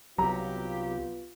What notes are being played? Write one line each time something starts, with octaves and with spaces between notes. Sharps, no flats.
C2 F#3 B3 F4 G4 A#5